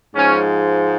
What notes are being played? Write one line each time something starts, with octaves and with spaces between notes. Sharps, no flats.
G#2 F3 G#3 C#4